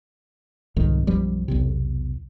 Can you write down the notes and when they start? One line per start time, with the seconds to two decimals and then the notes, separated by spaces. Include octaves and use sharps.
0.76 C2 F2 G#2 D#3
1.07 B1 F#2 F3 G3
1.48 B1 E2 C3